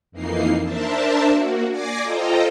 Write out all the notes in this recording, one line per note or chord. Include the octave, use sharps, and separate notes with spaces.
F2 E3 A#3 D#4 C7
D4 A#4 C5 E5 A5
A#3 F#4
D5 G#5 D6 G#6 A#6 C7
F4 A4 C5 D#5 G5 A#5